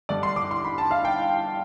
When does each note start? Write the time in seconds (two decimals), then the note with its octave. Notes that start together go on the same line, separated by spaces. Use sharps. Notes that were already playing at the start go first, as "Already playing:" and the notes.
0.09 G2 D3 D5
0.23 C6
0.36 D6
0.51 C6
0.64 B5
0.78 A5
0.91 F5
1.05 G5